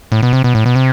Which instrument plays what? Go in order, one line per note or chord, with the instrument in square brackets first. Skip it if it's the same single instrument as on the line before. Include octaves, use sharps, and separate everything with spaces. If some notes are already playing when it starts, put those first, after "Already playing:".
[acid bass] A2
B2
C3
B2
A2
B2
C3